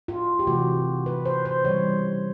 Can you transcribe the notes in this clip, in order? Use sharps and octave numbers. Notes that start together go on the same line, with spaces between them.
F4
G4
C3 E3 A3 F#4
B4
C5
C5
C#3 E3 G3 C#5